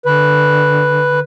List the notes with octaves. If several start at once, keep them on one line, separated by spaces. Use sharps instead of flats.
D3 B4